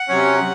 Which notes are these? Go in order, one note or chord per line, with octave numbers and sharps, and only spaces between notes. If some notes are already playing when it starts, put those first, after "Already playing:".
Already playing: F#5
C3 F#3 C#4